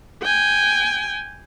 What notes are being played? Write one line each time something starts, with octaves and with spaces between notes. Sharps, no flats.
G5 G#5